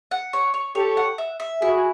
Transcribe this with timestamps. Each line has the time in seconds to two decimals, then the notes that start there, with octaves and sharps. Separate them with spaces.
0.11 F#5
0.33 C#5
0.54 C#5
0.75 G4 A4 C#5
0.97 F#5
1.18 E5
1.40 E5
1.61 E4 F#4 G#4